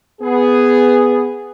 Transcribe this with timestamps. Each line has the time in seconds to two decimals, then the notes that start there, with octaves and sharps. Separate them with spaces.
0.21 B3 G#4